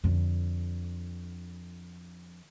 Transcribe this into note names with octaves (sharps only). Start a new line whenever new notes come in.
F2 D3